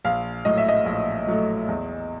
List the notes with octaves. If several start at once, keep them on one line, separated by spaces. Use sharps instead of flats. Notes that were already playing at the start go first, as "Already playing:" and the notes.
A#1 F5
A2 F#3 A3 D#5
E5
D#5
A#1
A2 F#3 A3
E2